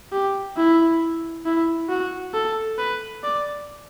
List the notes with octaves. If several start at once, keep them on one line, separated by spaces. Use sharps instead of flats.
G4
E4
E4
F#4
A4
B4
D5